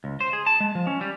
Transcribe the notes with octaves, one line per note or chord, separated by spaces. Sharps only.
C#2
C5
G#4
A5
G#3
F3
C#4
G3